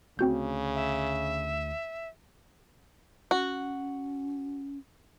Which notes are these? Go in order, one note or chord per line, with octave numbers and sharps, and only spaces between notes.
D2 C#3 A3 C4 F#4 G6
E5
C#4 F#4